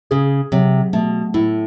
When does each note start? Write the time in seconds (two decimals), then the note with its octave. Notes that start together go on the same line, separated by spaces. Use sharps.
0.11 C#3 G#4
0.52 C3 F#3
0.93 B2 A3
1.34 A2 E4